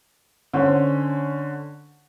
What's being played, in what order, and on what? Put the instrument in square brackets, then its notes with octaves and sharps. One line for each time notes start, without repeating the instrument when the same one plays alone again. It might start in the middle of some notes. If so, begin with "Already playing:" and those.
[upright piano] D3 C#4 C5